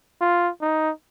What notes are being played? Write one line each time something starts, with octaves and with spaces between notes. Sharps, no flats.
F4
D#4